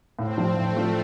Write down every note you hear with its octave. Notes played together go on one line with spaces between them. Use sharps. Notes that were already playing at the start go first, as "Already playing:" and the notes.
A2 C4
F3 D4 F4
A2 A3
F3 D4 F4